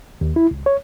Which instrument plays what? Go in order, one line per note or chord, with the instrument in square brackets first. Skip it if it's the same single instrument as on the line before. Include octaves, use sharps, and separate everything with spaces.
[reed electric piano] D#2
E4
C#2
C#5